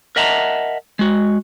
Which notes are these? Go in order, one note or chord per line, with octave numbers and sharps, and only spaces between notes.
A#4 D#5 E5 F#5 A5 A#5
G#3 F#4